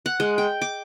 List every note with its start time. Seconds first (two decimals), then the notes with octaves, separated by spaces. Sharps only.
0.06 F#5
0.20 G#3
0.38 G5
0.62 D6